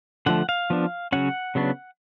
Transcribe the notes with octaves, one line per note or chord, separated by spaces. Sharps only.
D3 F3 A3 F#5
F5
F3 B3 D4
C#3 F#3 C#4 F#5
C#3 F#3 B3 D4